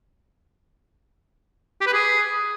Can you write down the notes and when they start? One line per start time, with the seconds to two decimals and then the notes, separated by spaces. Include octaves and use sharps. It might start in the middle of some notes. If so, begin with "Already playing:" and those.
1.81 G4
1.87 B4
1.93 G#4